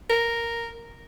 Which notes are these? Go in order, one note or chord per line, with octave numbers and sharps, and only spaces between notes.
A#4